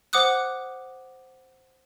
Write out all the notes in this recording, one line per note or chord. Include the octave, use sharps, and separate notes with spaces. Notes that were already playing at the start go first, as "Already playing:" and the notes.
C5 F#5 D6 D#6 F#6